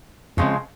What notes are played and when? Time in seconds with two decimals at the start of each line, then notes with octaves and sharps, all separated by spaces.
0.37 F2 C#3 F3 G#3 C4